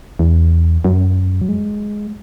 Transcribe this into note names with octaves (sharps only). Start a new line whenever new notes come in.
E2
F#2
F#3
G#3